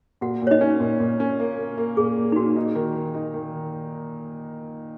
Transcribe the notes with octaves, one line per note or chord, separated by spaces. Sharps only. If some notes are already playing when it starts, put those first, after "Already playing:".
A#2 F#4 F#5
A#2 C#5
D#4 D#5
C#4
A#2
A#2
C#4
A#3
A#3
A#3
A#2 G#4
A#2
D#4
A#2 F#4
D#4
D#3
D#3
D#4
D#3